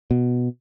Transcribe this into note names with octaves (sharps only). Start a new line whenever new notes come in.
B2